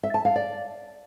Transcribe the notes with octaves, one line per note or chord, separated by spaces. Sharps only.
E5
A5
F5
D5